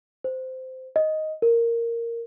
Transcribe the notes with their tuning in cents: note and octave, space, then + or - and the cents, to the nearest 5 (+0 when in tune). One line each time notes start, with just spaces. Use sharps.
C5 -15
D#5 +5
A#4 -5